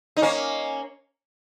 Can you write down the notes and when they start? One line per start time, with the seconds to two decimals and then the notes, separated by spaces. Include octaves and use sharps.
0.17 D#4
0.22 A#3 C#4